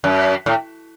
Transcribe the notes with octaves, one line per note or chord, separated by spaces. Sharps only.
F#2
A2